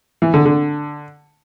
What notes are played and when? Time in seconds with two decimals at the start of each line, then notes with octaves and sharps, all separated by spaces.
0.22 E3
0.34 D3
0.45 D3